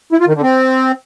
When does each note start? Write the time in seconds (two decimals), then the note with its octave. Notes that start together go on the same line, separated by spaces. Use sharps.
0.12 E4
0.20 F4
0.28 D#3
0.35 D3
0.43 C4